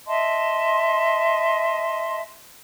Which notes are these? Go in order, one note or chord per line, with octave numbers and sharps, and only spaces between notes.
D#5 E5 A5 C6